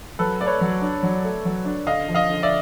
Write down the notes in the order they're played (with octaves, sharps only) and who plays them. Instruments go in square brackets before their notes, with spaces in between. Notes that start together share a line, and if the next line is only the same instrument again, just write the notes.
[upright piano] F#3 [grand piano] A4 B4
[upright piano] A3 [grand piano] D5
[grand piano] B4 C#5
[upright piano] F#3
D4
F#3
A3
F#3
D4
[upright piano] D3 [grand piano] D#5 F5
[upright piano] F3
[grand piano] D#5 F5
[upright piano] D3
[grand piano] D5 E5